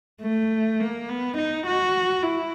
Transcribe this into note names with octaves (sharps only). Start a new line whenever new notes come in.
A3
A#3
B3
D#4
F#4
E4